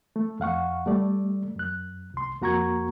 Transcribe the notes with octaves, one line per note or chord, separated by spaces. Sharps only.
A3
F2 F5 F#5 C#6
G3 A3 D5
F#2 F#6
C2 C6
F2 A#3 F#4 A#5 C#6 G#6